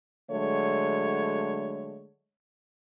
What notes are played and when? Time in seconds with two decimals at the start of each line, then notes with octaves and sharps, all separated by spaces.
0.31 D3 F#3 G#3 A3 C#5